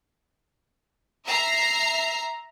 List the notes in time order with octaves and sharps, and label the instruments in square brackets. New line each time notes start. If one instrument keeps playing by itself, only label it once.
[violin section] E5 A#5 C7